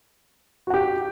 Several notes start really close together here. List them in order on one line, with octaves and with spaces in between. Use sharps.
F#4 F#5 G4